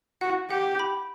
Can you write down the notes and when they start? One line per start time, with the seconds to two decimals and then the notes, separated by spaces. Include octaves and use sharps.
0.21 F#4 F#5
0.50 G4 F#5
0.79 B5